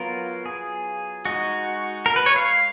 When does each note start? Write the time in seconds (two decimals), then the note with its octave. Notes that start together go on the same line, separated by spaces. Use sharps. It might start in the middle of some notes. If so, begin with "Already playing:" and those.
Already playing: F#3 B3 F4 A#4
0.46 G#4
1.25 G#3 D#4 F#4
2.06 A#4
2.16 B4
2.26 C#5
2.36 F5